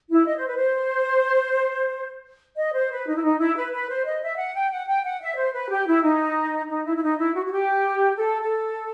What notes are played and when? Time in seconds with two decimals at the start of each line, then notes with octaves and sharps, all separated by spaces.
0.10 E4
0.27 D#5
0.37 C5
0.47 B4
0.56 C5
2.56 D#5
2.74 C5
2.90 B4
3.07 D#4
3.15 E4
3.23 D#4
3.39 E4
3.56 B4
3.72 B4
3.89 C5
4.04 D#5
4.21 E5
4.37 F#5
4.55 G5
4.71 F#5
4.87 G5
5.03 F#5
5.20 E5
5.36 C5
5.53 B4
5.70 G4
5.86 E4
6.02 D#4
6.68 D#4
6.85 E4
6.95 E4
7.02 D#4
7.17 E4
7.33 F#4
7.45 F#4
7.51 G4
8.16 A4
8.42 A4